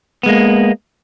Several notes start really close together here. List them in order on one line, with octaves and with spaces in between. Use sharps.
B3 G#3 A#3